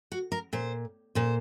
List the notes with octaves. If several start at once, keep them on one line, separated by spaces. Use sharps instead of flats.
F#4
A#4
A#2 C5
A#2 C5